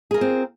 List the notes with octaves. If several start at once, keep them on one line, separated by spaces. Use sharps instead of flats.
C4 F4 G#4 A#4